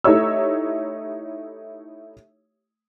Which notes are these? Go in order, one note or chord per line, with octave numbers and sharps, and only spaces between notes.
A3 D#4 E4 G4 C#5 E6